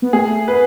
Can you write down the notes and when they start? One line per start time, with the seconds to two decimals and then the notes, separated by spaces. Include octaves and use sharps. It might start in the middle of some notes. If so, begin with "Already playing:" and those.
0.02 B3
0.13 A3 G#4
0.48 B3 B4